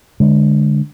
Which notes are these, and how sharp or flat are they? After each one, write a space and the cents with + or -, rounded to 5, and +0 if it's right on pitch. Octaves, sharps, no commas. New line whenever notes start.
D3 +0 G#3 +0